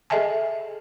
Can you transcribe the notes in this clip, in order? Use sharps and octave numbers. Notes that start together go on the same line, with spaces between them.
G#4 A4 D#5 E5 G#5 A5